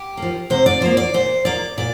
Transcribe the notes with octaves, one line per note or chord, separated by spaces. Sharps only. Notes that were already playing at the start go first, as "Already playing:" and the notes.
Already playing: G4
A#3
F3
C3 C5
D5
F3 A#3 C5
D5
A#2 C5
F3 A#3 D5
A#2 D5